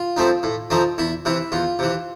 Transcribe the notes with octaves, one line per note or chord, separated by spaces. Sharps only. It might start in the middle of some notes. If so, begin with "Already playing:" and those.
Already playing: F4
F3 A3 C4 D#4
A2
F3 A3 C4 D#4
E2 E4
C3 E3 E4
E2 F4
C3 E3